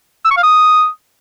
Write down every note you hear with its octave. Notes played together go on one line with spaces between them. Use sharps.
E6
C#6
F5
D#6